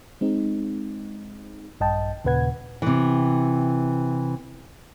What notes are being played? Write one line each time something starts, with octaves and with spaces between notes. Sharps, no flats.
G#3 C4 D#4
A#1 G2 D#5 G5 A5
D#2 A#2 C#3 B4 F#5 G#6
C3 E3